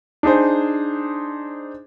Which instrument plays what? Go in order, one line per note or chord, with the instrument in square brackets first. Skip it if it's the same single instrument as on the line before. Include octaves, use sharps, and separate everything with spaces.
[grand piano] D4 D#4 G#4 C5